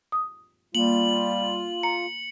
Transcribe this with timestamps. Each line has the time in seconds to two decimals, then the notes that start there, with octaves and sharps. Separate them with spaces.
0.12 D#6
0.75 G3 A#3 F4 F#7
1.83 A#5 C#7